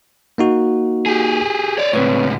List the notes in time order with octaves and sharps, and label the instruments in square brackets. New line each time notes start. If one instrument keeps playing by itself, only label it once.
[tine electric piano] A#3 D#4 F#4
[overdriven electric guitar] G4 G#4
C#5 D5
[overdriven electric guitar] C#2 A2 [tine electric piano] C4 B4 C#5